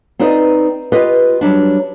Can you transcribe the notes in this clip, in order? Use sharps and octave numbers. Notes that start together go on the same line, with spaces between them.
C4 D#4 B4 D5 D#5
F4 G4 B4 D#5
F#3 G3 D4